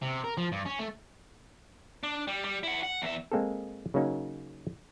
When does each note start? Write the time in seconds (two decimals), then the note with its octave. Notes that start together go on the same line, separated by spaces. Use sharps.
0.02 C3
0.24 A#4
0.38 F3
0.52 G2
0.66 C#4
0.79 A3
2.03 D4
2.27 G3
2.44 G3
2.63 E4 F#5
2.83 F#5
3.02 E2 E5
3.32 G#3 A#3 C4 G#4 A4
3.94 C#3 F#3 A#3 C#4 D#4